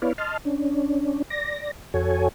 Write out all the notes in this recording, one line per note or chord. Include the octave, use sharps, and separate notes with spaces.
B3 E4 B4 C#5 D5 F5
D#5 A5 C6 F6
C#4 D4
D5 A#6
F2 F#4 A4 C#5 G#5